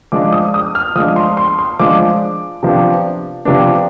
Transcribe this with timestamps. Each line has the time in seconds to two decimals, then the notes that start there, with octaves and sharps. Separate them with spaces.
0.12 F3 G#3 D4 D6
0.32 D#6
0.54 D#6
0.75 F6
0.95 F3 G#3 D4 D#6
1.16 C6
1.37 C6
1.59 C6
1.79 F3 G#3 D4 D6
2.63 C3 F3 B3 D4
3.45 C3 F3 B3 D4